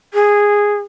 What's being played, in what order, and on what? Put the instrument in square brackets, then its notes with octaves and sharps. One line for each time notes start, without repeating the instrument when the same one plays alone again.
[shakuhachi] G#4